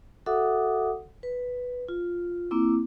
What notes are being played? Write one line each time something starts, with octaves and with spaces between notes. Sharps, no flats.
F#4 A4 E5 F#5 D6 D#6
B4
F4
A#3 C4 E4 D6